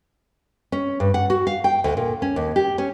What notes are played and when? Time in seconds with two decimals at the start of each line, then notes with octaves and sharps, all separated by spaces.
0.72 C#4
1.00 G2
1.14 F#5
1.30 F#4
1.47 F5
1.64 G5
1.84 D2
1.97 A#2
2.22 C#4
2.36 D#2
2.56 G4
2.78 C#4